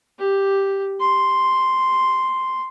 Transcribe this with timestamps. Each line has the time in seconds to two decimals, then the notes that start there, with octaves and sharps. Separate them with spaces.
0.19 G4
1.00 C6